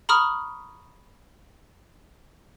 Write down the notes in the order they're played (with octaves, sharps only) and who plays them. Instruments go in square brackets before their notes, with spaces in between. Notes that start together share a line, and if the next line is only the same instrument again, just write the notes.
[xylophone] A#5 B5 C#6 D#6 F6